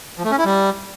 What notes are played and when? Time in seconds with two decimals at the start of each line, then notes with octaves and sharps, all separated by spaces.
0.18 F3
0.24 A3
0.31 C#4
0.38 E4
0.45 G3